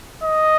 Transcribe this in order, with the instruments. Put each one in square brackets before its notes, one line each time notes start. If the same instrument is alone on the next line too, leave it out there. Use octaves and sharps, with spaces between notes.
[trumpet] D#5